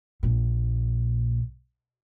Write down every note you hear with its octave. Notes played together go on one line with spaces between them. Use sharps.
A#1 A#2